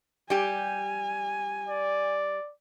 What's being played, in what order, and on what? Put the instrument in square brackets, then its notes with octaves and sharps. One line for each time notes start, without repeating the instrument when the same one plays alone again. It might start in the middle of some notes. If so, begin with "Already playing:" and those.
[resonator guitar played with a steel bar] G3 G4 [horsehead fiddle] G#5
[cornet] D5